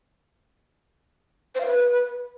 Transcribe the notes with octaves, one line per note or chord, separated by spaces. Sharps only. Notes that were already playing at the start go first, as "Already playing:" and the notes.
C5
F5
B4